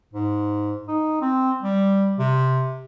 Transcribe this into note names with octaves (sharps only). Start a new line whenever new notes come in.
G#2
D#4
C4
G3
C3